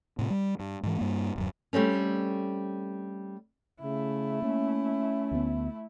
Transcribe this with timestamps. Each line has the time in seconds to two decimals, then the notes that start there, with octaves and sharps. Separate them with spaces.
0.19 A2 C3
0.30 G3
0.59 G2
0.83 G#2 E3
0.98 G2 A#3
1.36 D1 F#2
1.73 G3 A3 C4 C#4
3.82 C#3 A3 E4
4.42 A#3 C#4
5.31 D2 B3